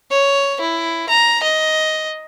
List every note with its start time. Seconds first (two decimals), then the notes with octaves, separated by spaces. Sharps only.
0.11 C#5
0.61 E4
1.09 A#5
1.43 D#5